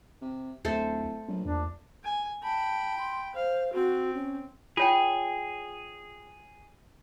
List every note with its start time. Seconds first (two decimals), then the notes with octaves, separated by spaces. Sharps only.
0.22 C3
0.65 D1 D2 A3 A4 C5
1.29 A#1 F#3
1.46 E2 D4
2.04 G#5
2.43 G5 A5 B5
2.98 C6
3.35 C5 F5
3.73 C4 F#4
4.14 C#4
4.77 F4 G#4 C#5 G5